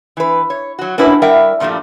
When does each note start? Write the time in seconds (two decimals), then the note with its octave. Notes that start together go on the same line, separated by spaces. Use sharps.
0.17 E3 B4
0.50 C#5
0.79 F#3 F#4
0.98 A#3 C#4 D4 E4 F#4 B4
1.22 G3 A#4 E5 F#5 G5
1.60 G2 A#2 F3 G3 A3